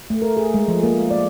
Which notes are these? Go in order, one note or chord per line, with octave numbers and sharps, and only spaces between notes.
A3
A#4
G#4
G#3
F3
A#3
D5